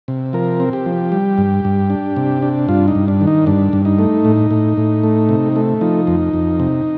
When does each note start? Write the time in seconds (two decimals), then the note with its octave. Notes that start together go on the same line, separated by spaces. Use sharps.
0.08 C3
0.33 F3 A#4
0.60 C4
0.73 G4
0.86 F3
1.12 G3
1.38 G2
1.65 G2
1.90 D4
2.16 C3
2.42 D4
2.68 G2 F4
2.88 D#4
2.95 G2
3.08 D4
3.21 D#3
3.27 D#4
3.46 G2 D4
3.73 G2
3.85 D#4
3.99 A3
4.25 A2
4.51 A2
4.77 A2
5.03 A3
5.29 C3
5.56 A3
5.81 F3 D#4
6.07 F2
6.33 F2
6.60 C3